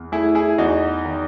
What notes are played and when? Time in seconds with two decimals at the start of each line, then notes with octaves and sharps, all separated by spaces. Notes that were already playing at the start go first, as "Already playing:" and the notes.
Already playing: E2
0.12 A3 E4 G#4
0.35 E4 G#4
0.58 E2 D#4 F#4
1.05 D#3